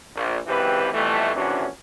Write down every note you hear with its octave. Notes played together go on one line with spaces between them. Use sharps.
A#1
G#1 C#2 E3 C4 G4 B4
F2 B2 E3 G3 A3
A#1 C3 E3 C#4 D4 F#4